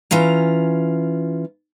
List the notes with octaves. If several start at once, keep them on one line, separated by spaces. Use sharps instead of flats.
E3 C#4 F4 A#5